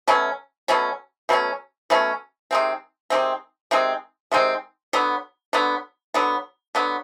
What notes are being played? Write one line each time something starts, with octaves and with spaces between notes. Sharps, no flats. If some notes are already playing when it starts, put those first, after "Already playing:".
B2 F#3 A3 C#4
B2 F#3 A3 C#4
B2 F#3 A3 C#4
B2 F#3 A3 C#4
C3 D#3 G#3 C4
C3 D#3 G#3 C4
C3 D#3 G#3 C4
C3 D#3 G#3 C4
D3 F#3 B3
D3 F#3 B3
D3 F#3 B3
D3 F#3 B3